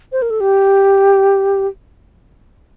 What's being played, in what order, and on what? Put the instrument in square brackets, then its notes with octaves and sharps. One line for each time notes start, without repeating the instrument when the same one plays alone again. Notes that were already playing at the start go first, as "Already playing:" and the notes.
[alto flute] C5
A#4
A4
G4